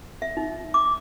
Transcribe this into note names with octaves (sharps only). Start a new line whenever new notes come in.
E5
D#4
D6